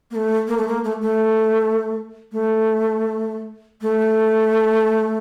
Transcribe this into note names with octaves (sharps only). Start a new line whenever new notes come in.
A#3
A3
A#3
A3
A#3
A3
A3
A3
A3